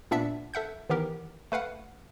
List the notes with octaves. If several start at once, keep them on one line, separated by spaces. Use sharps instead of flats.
A#2 B3 D4 E5 B6 C#7
A4 E5 F#5 G6
D#3 E3 B3 G4 A#4
A3 B4 F5 F#5